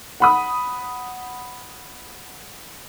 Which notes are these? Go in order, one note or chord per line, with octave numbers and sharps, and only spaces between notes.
F#5 B5 D#6